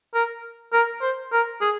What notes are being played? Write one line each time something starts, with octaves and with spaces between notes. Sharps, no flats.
A#4
A#4
C5
A#4
G#4